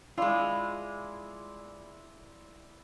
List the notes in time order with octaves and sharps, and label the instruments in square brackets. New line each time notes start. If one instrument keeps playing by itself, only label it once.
[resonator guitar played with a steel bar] G#3 F4 [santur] E4 D5 C6